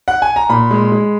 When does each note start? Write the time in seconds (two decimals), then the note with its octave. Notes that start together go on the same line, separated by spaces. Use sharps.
0.08 F#5
0.22 G#5
0.36 A#5
0.49 A#2 B5
0.71 G#3
0.92 G#3